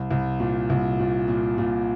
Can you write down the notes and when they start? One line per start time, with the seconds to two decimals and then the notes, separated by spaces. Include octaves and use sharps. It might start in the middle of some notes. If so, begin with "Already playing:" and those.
Already playing: C2
0.10 C2
0.40 A#2
0.70 C2
0.99 A#2
1.28 A#2
1.58 A#2